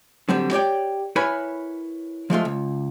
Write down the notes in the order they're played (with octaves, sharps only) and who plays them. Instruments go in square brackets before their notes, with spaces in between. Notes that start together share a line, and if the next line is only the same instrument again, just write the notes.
[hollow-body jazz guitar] D3 F#3 G3 C4
G4 C#5 D5 G5
E4 A#4 B4 C#5 G#5 B5
F3 G#3 A3 F4
C#2